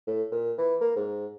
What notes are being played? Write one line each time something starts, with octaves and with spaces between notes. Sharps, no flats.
A2
A#2
E3
A#3
G#2